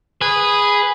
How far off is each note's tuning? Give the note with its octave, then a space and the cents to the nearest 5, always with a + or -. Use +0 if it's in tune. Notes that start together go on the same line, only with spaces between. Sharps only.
G#4 -10 B4 +0